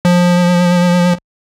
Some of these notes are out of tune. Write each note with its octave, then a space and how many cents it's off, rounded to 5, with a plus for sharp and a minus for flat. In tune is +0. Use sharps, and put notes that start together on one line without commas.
F3 +20